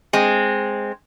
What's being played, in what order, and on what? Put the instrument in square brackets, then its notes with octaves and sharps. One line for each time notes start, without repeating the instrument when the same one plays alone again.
[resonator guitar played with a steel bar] G#3 C4